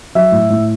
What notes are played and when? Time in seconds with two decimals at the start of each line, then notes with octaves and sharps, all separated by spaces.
0.15 F#3 E5
0.32 A2
0.50 A2